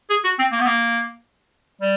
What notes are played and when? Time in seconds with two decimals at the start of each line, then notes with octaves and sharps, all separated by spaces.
0.10 G#4
0.24 F#4
0.39 C4
0.52 A#3
0.60 B3
0.66 A#3
1.81 G3